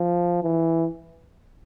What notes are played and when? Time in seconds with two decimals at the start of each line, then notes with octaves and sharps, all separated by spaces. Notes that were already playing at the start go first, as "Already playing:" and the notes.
Already playing: F3
0.43 E3